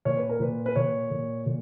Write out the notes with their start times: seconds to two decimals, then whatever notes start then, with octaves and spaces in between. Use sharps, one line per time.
0.05 A#2 C#5
0.17 B4
0.29 A#4
0.40 A#2 B4
0.66 B4
0.75 A#2 C#5
1.11 A#2
1.46 A#2